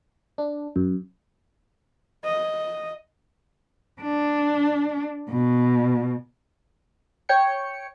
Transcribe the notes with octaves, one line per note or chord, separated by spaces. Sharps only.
D4
F#2
D#5
D4
B2
C#5 G5 C#7